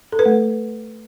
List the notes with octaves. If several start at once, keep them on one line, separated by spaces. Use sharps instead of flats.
A4
B4
A3